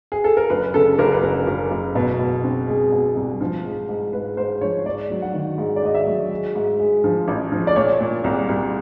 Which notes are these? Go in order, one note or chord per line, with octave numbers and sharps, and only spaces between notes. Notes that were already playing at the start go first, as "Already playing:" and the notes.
G#4
A4
A#4
F#1 B4
C#3 A4
F#1 A#4
B4
F#1 A#4
F#1
F#1
B2
B2
C4
G#3
B2
C2
F3
G#2
G#2
G#2 B4
G#2 C5
F3 C#5
G#2 D5
F#3
F#5
D#3
G#2
D5
G#2 D#5
E5
F#3
G#3
G#2
G#3
F3
A1
F3
D5
A#2 C#5
A#2
C2
C2